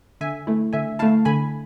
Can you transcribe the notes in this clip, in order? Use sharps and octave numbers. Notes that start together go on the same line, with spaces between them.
D3 E5 G#5
A3 E4
D3 E5 G#5
A3 E4 F5 A5
D3 G#5 B5